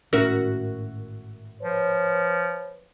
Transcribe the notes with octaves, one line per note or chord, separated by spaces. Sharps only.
G#1 A2 C#4 F#4 A#4 E5
F3 B4 C#5